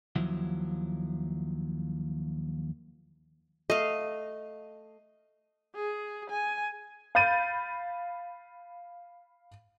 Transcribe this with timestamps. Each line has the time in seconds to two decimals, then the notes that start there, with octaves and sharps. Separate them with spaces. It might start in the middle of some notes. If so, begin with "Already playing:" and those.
0.16 D#2 F3 F#3 E4
3.70 A3 D#5 F5
5.75 G#4
6.30 G#5
7.15 F5 B5 G6 A6 D#7